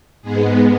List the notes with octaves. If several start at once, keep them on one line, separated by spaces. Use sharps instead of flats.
G#2 G#3 B3 G#4